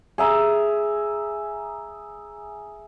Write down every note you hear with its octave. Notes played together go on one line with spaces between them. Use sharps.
G#4 E5 A#5